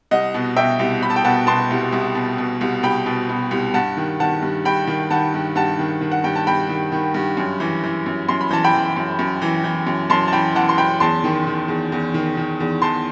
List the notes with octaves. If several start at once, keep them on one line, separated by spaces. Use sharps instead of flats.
C2 D#5 F#5
B2
B2 E5 G5
C2
C2 B5
A5
G5
B2 F#5 A5
B2 A5 C6
C2
C2
B2
B2
C2
C2 G5 B5
B2
B2
C2
G2 F#5 A5
D#3
D#3 F#5 A5
G2
G2 G5 B5
D#3
D#3 F#5 A5
G2
G2 F#5 A5
D#3
D#3
F#5
G2 G5
A5
G2 G5 B5
D#3
D#3
G2
F#2
E3
E3
F#2
F#2 C6
B5
E3 A5
G5 B5
E3
F#2
F#2
E3
E3
F#2
F#2 A5 C6
A5
E3 G5 B5
E3 F#5 A5
C6
F#2 G5 B5
E2 A5 C6
D#3
D#3
E2
E2
D#3
D#3
E2
E2 A5 C6